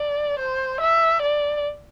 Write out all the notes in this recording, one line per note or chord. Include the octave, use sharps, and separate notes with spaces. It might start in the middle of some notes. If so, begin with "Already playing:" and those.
Already playing: D5
C5
E5
D5